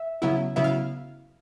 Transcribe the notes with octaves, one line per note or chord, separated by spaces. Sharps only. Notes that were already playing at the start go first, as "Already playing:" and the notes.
Already playing: E5
C#3 F#3 B3 E4
C#3 F#3 B3 E4 E5
F5